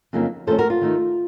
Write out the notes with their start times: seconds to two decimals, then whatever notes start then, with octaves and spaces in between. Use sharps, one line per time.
0.13 F2 C#3 F#3 A#3 D#4
0.47 F2 D#3 A3 C#4 A4 C5
0.58 F#4 A#4
0.70 F4
0.81 D#3 A3 D#4